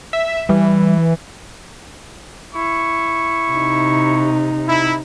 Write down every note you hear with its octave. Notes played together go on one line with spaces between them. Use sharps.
E5
E3 G3
E4 C#6
C3 D#4
E4